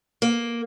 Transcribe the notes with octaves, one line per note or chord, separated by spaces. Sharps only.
A#3